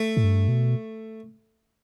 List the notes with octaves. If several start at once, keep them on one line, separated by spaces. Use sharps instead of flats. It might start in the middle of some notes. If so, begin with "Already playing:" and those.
Already playing: A3
A2
G2
B2